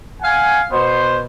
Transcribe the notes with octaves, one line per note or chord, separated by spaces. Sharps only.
F5 F#5 G#5
B2 B3 C5